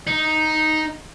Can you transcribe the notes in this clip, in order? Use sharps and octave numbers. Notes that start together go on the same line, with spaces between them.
D#4